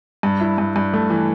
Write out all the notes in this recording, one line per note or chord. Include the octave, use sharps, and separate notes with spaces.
G2
E4
G2
G2
A3
E3